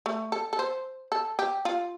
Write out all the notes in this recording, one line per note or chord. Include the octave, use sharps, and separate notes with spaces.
A3
A4
A4
C5
A4
G4
F4